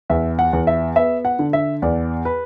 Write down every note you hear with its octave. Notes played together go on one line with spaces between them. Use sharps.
E2 E5
F#5
E2
E5
B3 E5
F#5
D3
E5
E2 D5
B4